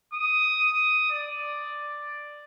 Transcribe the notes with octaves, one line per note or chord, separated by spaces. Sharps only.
D#6
D5